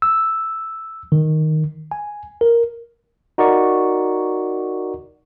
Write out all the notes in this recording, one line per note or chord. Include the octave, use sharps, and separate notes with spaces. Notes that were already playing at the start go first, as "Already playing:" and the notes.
E6
D#3
G#5
A#4
D#4 F#4 A#4 D5 C#6